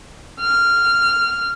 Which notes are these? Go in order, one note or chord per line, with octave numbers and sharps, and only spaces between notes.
F6